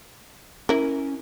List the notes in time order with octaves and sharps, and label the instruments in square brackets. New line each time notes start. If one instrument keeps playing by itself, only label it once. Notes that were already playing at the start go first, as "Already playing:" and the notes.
[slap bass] C#4 [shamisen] E4 A#4